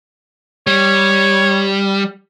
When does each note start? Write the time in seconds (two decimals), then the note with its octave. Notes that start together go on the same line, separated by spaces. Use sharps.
0.67 G3 C#5